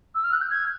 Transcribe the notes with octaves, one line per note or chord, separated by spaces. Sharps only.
E6
F6
F#6
G6
G#6